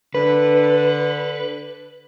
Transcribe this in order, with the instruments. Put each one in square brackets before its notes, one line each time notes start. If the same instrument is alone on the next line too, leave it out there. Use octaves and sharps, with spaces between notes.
[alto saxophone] D3 [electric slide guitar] B4